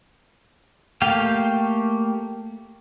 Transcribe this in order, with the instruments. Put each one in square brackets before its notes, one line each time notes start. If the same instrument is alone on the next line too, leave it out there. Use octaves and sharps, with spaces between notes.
[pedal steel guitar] A3 A#3 G4 F5 G5